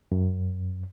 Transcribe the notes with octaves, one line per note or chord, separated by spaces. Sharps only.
F#2